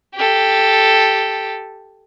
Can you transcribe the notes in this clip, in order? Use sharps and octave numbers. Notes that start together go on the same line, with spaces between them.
G4 A4